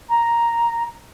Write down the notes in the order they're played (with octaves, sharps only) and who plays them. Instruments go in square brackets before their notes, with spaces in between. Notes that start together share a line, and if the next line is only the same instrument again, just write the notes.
[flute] A#5